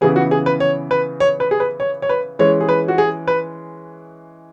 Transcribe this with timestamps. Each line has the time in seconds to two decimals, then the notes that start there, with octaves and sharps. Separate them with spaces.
0.01 C#3 E3 B3 G#4
0.16 F#4
0.31 G#4
0.46 B4
0.60 C#5
0.91 B4
1.20 C#5
1.40 B4
1.51 G#4
1.60 B4
1.80 C#5
2.02 C#5
2.09 B4
2.39 E3 G#3 C#4 C#5
2.60 G#4
2.69 B4
2.88 F#4
2.98 G#4
3.28 B4